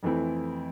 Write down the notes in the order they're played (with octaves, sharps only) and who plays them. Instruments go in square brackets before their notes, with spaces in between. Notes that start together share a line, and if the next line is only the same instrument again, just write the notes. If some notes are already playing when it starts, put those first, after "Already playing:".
[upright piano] F2 E3 A3 C4 E4